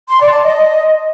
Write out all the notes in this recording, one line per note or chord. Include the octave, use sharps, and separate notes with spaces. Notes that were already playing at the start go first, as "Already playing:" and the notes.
C6
D5
A5
D#5